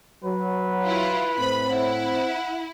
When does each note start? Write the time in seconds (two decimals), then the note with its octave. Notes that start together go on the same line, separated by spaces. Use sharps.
0.24 F#3 B4
0.84 E4 F4
1.37 A2 C4 C5 B5
1.70 E4 F#5